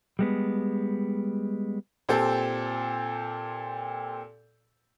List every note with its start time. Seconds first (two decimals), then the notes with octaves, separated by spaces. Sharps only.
0.19 G3 G#3 B3
2.09 A#2 C4 G4 A4